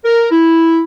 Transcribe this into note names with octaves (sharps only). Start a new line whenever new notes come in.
A#4
E4